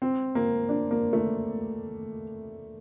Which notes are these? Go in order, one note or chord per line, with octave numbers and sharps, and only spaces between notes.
C4
A#3
D4
A#3
A3